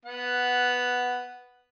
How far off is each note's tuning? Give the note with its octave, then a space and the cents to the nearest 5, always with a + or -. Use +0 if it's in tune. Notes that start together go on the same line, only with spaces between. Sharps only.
B3 +0 F#5 +0